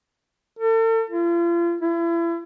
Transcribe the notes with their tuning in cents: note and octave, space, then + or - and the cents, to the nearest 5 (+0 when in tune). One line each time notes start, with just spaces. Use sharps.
A4 +40
F4 -40
E4 +35